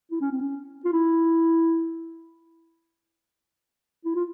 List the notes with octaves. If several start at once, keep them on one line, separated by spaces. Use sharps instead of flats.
E4
C#4
C4
C#4
F4
E4
E4
F4